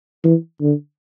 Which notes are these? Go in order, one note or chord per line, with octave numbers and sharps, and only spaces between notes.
E3
D3